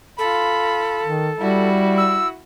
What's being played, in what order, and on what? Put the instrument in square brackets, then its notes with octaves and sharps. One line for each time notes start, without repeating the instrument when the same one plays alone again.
[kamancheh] F4 B5 [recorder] A4
[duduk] D#3
[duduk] G3 [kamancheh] E4 F#4
[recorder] E6